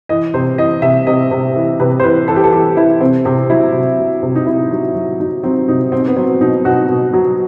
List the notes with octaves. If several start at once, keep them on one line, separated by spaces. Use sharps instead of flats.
E3 D#5
C3 C5
E3 D#5
C3 E5
C3 D#5
C3
E3
C3 B4
C5
E3 B4
E3 A4
G4
A4
E3 G4
E3 E4
C3 C4
C3 C4
F#3 E4
C3
F#3
C3
D#4
C3 E4
F#3
F#3
F#3 D#4
F#3 C4
C3 D#4
B2 C4
B3
F#3 C4
B2 D#4
B2 F#4
B2
F#3 F#4